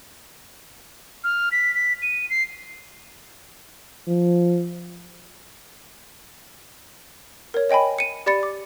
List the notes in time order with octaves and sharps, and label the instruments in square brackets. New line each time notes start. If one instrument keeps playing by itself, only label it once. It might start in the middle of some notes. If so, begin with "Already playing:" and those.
[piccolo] F6
B6
B6
D#7
C7
[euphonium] F3
[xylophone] A#4 C#5
C#5 D#5 G5 G#5 B5
C#7 D#7
G4 D5 B5 A6 C#7
D6